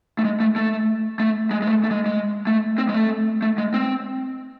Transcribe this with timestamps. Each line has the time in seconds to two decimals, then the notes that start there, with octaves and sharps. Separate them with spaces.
0.19 A3
0.24 G#3
0.40 A3
0.56 A3
1.20 A3
1.51 G#3
1.62 G#3
1.67 A3
1.84 A3
1.91 G#3
2.06 G#3
2.47 A3
2.78 C4
2.89 G#3
2.94 A3
3.42 A3
3.58 G#3
3.74 C4